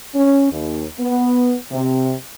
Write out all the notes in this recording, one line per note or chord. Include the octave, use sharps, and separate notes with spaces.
C#4
D#2
B3
C3